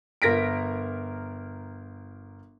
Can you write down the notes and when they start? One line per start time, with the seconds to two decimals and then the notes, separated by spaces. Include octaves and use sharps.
0.22 G1 A#4 A#6 B6 D7